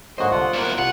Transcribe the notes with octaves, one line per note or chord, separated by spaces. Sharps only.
G#2 D3 F#3 A#3 F#4 C5 D#5
C2 D3 F4 F#5
B1 A#3 E4 F#6
C2 F4 F#5